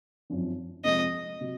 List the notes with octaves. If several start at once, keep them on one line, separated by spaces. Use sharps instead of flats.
G#1 F#2 F3
F2 C3 F3 G#3 D#5
C3 F#3